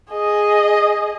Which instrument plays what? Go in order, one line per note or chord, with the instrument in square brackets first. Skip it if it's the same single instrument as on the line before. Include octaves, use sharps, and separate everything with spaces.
[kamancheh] G#4 D#5